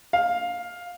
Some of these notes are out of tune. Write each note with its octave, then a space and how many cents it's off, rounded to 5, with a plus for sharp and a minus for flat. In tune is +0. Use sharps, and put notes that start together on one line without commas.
F5 +15